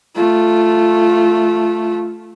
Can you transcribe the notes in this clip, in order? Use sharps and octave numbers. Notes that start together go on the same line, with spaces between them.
A3 F4